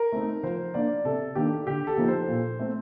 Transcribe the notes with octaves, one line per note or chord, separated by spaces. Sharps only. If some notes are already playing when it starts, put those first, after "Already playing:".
Already playing: A#4
A3 C4 D#4
F3 C5
A#3 D4 D5
C3 A4
D#3 A#3 D4 G4
D3 G4
A4
F3 A#3 D#4
C5
A#2
A3 C4